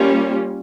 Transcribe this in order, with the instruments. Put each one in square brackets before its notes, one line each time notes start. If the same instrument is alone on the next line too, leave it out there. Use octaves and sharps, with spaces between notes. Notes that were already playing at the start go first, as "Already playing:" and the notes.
Already playing: [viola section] G3 A#3 C#4 F4